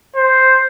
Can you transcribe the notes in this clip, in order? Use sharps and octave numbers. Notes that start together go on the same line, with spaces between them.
C5